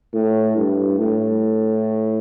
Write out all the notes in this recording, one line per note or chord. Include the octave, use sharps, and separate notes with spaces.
A2
G2
A2